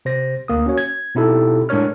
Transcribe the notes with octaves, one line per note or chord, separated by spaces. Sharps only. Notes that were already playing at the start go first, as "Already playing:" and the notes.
C3 C5 A#6
D2 A#3 D#6
C#4 F#4 C#5
G#6
B2 C4 D#4 E4 G4 A4
A2 G#3 D4 A#4 C#5 F6